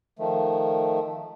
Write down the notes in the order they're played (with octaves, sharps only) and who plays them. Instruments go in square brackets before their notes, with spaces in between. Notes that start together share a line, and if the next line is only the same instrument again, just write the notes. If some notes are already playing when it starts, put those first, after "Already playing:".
[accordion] D#3 F3 A3